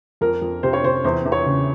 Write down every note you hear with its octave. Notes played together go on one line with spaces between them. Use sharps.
F2 A#4
F2
C3 C5
C#5
C3 C5
E2 C5
E2
C#5
C#3